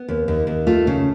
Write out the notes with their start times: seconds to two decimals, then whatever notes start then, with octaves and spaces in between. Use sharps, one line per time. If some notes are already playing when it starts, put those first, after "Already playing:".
Already playing: B3
0.09 D#2
0.28 D#2
0.47 D#2
0.67 A3 F4
0.87 C#3